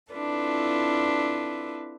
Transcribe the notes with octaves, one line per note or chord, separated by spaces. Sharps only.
C4 D4 E4 F4 A4 B4